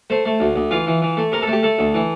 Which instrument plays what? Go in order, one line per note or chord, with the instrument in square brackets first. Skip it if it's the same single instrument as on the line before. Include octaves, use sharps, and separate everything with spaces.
[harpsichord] A3 C5
A3
D2
D2
E3 F4
E3
E3
A3
C3 A#4
A4
A3
G4
A3 A4
D2
E3